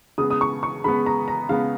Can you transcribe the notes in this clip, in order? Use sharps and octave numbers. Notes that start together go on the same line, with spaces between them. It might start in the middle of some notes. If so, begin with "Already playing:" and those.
C#3 G#3 B3 D#6
D#6
C#6
C#6
C#3 G#3 B3 B5
A#5
A#5
C#3 G#3 B3 F5